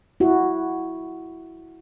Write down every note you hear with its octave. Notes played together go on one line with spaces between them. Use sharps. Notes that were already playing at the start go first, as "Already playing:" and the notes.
E4 F#4